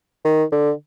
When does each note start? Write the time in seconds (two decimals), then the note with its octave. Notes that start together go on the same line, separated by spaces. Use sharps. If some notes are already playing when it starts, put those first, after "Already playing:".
0.25 D#3
0.52 D3